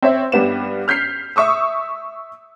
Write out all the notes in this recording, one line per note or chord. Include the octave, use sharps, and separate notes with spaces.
C4 C#5 E5
G2 G3 B3 E7
F6 G6 B6 C7
E5 C#6 D#6 E6